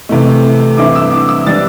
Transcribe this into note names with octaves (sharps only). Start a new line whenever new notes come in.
C3 E3 A3
G2 E3 C4 E4 D6
E6
D6
E6
E3 G3 D4 A6